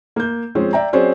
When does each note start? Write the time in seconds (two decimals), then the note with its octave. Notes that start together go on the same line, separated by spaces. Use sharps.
0.16 A#3 G6
0.55 F3 G#3 C4 C#4
0.73 D5 E5 G5 A#5
0.93 F#3 C4 C#4 G#4 C5 D5